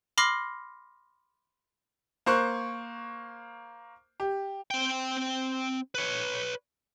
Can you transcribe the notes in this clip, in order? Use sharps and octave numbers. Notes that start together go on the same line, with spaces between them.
B5 C6 D6 F6 A#6 C7
A#3 C5 C#6 F#6
G4
C4 G5
B4 C#5